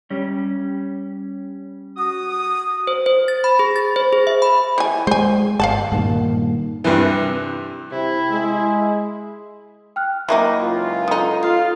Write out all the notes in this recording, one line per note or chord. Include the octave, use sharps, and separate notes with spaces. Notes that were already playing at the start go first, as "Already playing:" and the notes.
G3 C#4
F#4 D#6
C5
C5
A6
B5
G#4
A6
C5
G#4
E5
B5
E3 G#5
G#3 C5 G#5
G1 F5 F#5 A5
G2 A#2 D#3
G2 C3 E3
C3 E4
G#3
G5 F6 F#6
F#3 A#3 D#4 E4 D6
C#2 F#2 F4
F#3 D#4 A4 D#6
F4 F5